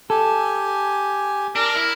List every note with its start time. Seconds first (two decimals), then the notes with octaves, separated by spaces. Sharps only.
0.10 G4 A4 G#5
1.56 D4 A#4
1.75 E4